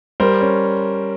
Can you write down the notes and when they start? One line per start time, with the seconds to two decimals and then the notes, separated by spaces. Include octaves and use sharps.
0.20 G3 A#4 C5
0.41 C#4